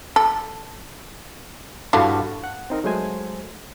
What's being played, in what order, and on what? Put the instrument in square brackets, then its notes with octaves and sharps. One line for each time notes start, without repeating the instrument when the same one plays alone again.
[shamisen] A4
[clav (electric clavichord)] G2 F#4 A5 [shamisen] D3 E4 F5
[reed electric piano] F#5
C4 D#4 A#4
F#3 G#3 A3 C5 G#5